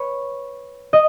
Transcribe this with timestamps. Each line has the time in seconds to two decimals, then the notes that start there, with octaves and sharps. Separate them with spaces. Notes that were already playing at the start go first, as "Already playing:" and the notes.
Already playing: B4 C#5
0.93 D#5